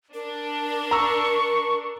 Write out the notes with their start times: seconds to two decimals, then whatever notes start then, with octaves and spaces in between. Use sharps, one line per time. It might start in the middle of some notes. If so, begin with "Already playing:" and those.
0.14 D4 A#4
0.91 A#5 C#6 E6